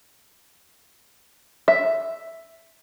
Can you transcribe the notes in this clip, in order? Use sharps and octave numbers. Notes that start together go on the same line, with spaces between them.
E5